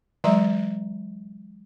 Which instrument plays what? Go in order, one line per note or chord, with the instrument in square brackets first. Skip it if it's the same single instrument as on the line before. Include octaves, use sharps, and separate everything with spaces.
[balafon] E3 F#3 G#3 E5 A#5